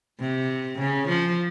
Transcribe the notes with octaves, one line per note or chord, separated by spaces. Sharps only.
C3
C#3
F3